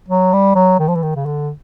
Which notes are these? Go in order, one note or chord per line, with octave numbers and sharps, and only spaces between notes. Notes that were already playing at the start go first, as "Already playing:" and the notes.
F#3
G3
F#3
D#3
F3
E3
D#3
C#3
D3